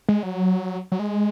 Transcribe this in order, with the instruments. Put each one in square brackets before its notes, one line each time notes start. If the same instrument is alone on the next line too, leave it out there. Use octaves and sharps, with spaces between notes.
[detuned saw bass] G#3
F#3
F#3
G#3